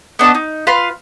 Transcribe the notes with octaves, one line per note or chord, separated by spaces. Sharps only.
B3 D4 D#5 A5
D#4
F4 B4 F5 C6